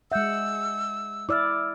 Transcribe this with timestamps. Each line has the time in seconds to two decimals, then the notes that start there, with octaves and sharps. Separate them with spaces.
0.12 G#3 E5 F#5 E6 G6
1.29 E4 D5 D6 E6 F6